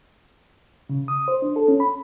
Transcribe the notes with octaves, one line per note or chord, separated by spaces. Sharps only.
C#3
D#6
C5
D4
A4
C#4
B5